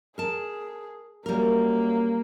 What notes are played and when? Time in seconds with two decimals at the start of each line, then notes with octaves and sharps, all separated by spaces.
0.18 G#4 A#4 A5
1.26 F#2 G3 A#3 A#4